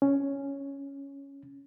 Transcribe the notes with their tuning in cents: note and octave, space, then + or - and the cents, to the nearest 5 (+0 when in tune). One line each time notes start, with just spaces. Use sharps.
C#4 +0